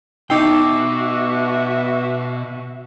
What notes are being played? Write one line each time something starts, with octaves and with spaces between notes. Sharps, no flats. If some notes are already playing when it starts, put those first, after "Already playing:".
B2 D#4 F#4 E5 G5 D6 E6 C7